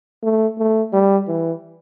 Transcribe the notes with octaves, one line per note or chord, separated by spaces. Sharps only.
A3
A3
G3
E3